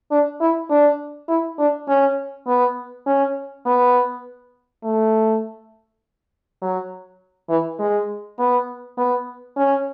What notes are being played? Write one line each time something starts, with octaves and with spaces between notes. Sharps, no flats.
D4
E4
D4
E4
D4
C#4
B3
C#4
B3
A3
F#3
E3
G#3
B3
B3
C#4